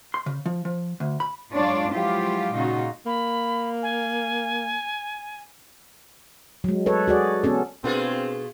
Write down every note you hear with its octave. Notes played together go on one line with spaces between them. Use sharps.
C6
C#3
F3
F3
D2
B5
F#2 G#3 D4 F4 C#5 D5
F3 F#3 G#3 E4 F4 G4
A#2 C#3 D#4 F4 F#4
A#3 B5
G#5
F#3 G#3
A4 B4 C#5
F#4 G#4 D5
B3 C#4 A4
B2 A3 C4 D4 F4 G#4 B4